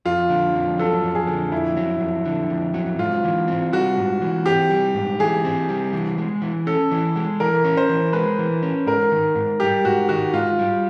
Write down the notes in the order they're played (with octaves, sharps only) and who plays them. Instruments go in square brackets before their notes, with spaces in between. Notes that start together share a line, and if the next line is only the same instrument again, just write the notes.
[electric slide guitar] F2 [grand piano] F4
[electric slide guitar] D3
F2
[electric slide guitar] F#3 [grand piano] A4
[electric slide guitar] F2
[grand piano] G#4
[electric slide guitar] D3
[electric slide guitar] F2 [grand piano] E4
[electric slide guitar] F#3
F2
D3
F2
F#3
[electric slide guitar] G#2 [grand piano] F4
[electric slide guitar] E3
C4
[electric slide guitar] G3 [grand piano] F#4
[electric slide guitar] G#2
E3
[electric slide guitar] C4 [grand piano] G4
[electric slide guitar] G3
G#2
[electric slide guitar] E3 [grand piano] G#4
[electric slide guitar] C4
G3
E3
G#3
E3
[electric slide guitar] C#4 [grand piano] A4
[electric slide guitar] E3
G#3
[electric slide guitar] E3 [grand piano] A#4
[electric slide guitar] C#4
[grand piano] C5
[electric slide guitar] E3
[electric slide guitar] G#3 [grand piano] B4
[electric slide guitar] E3
C#4
[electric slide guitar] G#2 [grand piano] A#4
[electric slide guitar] D#3
G#2
[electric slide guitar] G3 [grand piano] G4
[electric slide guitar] G#2 [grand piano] F#4
[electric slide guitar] D#3 [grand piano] F#4
[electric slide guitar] G#2 [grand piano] F4
[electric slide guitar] G3